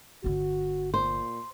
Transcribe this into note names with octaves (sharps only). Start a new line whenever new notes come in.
G1 D3 F#4
A#2 C5